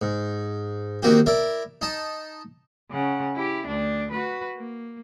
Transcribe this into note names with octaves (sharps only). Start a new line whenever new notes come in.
G#2
D#3 A#3 C4 F#4 G4
E4 A#4 D5
D#4 A5
C#3 F#5
E4 G4
D2 D4
F#4 B4
A#3